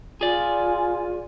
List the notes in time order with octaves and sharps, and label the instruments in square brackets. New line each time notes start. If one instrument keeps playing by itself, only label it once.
[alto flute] F4 [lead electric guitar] G#4 D5 [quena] G#5